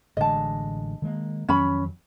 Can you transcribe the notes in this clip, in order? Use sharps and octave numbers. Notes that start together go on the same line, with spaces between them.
A1 D3 G#3 D#5 A5
D#3 G#3 A#3
F2 D#3 F#3 C#4 B5